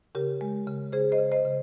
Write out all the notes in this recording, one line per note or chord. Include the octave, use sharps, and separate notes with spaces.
C#3 G4 A#4
G#3
C#3
C#3 G#4 C5
C5 D#5
C#3
C5 D#5
C#3